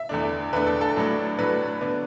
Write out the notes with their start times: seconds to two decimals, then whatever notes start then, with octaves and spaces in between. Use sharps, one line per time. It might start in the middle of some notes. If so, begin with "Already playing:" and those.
Already playing: E5
0.09 E2 D3 A3 D4
0.53 E2 D3 A3 D4 B4
0.67 A4
0.81 A4
0.96 A2 F#3 A3 D4
1.38 A2 F#3 A3 D4 B4
1.81 D3 B3 D4